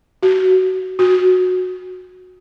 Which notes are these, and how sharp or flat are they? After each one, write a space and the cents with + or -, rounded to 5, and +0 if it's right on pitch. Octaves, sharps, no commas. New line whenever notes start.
F#4 +15
F#4 -15